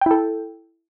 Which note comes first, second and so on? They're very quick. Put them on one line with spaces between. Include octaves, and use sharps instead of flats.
G5 E4 A4